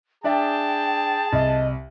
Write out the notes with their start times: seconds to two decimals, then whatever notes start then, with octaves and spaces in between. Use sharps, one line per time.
0.24 D4 G#4 D5 E5 G5 A5
1.33 C2 D#5